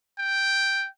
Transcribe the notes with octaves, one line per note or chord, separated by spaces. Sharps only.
G5